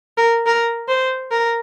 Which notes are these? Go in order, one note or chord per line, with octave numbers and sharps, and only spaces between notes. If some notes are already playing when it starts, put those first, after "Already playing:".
A#4
A#4
C5
A#4